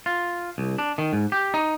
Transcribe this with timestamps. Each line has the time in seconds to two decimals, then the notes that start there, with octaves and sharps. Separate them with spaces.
0.06 F4
0.58 C2
0.78 D4
0.98 D#3
1.13 G#2
1.32 G4
1.54 D#4